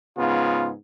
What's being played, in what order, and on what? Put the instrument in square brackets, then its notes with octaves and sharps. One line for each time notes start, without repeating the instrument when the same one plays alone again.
[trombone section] G#2 C#3 B3 [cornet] F4